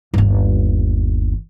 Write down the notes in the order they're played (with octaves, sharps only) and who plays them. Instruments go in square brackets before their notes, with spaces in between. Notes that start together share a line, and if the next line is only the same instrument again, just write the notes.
[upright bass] G1 D#2